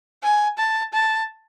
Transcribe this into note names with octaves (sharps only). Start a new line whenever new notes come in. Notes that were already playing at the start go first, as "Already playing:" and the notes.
G#5
A5
A5